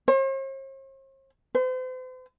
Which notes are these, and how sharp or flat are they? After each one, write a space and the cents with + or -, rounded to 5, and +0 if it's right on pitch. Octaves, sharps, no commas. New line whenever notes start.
C5 +45
C5 -40